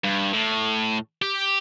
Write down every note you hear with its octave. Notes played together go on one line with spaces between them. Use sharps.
G2
A2
G4